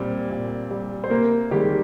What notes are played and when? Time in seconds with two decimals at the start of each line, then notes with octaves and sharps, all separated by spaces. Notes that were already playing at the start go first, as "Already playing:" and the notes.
Already playing: A#2 G3 C4
0.30 A#2
0.71 G3
1.04 C5
1.10 C3 A#3 A#4
1.51 D#3 G3 G#3 G4